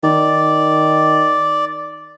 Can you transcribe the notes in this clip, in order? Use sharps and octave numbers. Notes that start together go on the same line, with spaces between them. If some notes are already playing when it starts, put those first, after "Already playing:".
D#3 D5